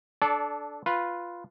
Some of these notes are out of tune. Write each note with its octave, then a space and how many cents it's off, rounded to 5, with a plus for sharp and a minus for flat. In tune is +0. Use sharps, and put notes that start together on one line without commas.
D4 +0 A4 -20 D5 -30
F4 +0 B4 -5